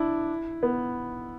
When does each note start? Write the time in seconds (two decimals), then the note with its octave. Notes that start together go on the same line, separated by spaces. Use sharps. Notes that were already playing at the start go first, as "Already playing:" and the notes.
Already playing: D4 E4
0.63 B3